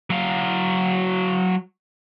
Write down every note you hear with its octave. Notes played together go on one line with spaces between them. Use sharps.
F#3 F5